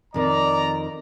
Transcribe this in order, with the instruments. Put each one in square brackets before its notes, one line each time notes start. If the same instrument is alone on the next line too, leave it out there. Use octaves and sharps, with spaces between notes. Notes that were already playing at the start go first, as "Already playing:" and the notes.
[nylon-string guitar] F2 D#3 [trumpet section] D5 A#5